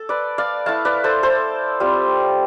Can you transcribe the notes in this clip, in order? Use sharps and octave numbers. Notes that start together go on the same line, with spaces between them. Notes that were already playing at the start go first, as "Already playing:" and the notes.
Already playing: A4
B4 D5
D5 F5
A3 E4 F5 A5
B4 D5
A4 C5
A4 C5
G3 C4 F4